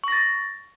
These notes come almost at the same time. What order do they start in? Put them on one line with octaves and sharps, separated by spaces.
C#6 A#6 A6